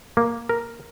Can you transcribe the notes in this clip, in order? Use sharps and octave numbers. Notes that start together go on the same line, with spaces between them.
A#3
A#4